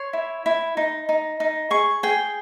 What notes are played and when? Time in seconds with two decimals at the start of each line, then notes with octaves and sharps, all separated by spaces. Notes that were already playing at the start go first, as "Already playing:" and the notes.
Already playing: C#5 C6
0.13 E4
0.46 E4
0.77 D#4
1.09 D#4
1.40 D#4
1.71 G#4 C#6
2.03 G#4 G5